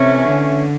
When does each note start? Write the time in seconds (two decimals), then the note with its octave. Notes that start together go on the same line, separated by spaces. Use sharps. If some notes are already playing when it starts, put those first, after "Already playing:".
Already playing: C3 E3 A3 C#4
0.26 D3